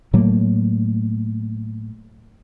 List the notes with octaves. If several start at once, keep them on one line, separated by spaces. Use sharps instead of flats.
A2 F#3 A3 A#3